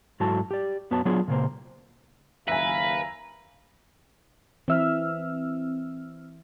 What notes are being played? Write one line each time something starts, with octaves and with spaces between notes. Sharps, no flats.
G#2 F#3 E4 F#4 A4 A5
G4 D5
F#2 B3 F#4 C#5 A5
F#3 B3 D4 F4 G#4 C#5
A#2 C#3 A#3 C5
F#1 D#2 B4 E5 F5 G#5 A#5
E3 C4 E5 E6 F6